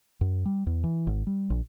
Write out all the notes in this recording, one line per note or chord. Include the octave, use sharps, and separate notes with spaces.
F#2
G3
E2
E3
G#1
G3
A#1